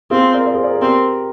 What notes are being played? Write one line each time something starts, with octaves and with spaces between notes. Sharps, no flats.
C4 F4 G#4
A#4 D5
A#4 D5
G#4 C5
A#4 D5
G#4 C5
C4 G4 A#4